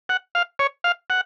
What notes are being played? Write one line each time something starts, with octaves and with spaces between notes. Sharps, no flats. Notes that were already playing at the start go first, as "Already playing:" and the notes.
F#5
F5
C#5
F5
F#5